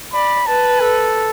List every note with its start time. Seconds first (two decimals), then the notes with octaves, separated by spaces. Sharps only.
0.13 D5 B5
0.47 B4 A5
0.81 A4